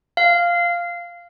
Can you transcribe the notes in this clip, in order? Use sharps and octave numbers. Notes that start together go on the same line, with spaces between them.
F5